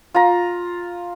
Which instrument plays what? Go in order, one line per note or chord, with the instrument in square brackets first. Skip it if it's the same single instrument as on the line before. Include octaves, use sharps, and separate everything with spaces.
[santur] F4 A#5